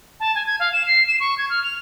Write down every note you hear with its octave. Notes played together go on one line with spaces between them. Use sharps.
A5
G#5
G#6
F5
E7
C7
E7
C#6
G#6
F6
F7